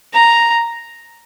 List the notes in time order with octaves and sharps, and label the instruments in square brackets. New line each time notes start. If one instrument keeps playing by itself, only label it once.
[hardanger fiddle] A#5